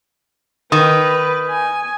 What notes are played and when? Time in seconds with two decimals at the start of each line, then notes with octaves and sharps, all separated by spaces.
0.72 D#3 B4 D#6
1.49 G#5